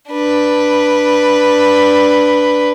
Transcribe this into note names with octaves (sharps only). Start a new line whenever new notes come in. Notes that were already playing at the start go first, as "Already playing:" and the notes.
D4 B4